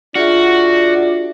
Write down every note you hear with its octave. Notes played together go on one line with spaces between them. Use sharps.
D4 F4 F#4 G#4 E5